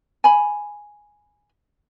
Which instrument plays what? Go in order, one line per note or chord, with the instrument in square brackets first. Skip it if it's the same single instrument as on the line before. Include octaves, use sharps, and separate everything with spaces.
[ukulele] G#5 B5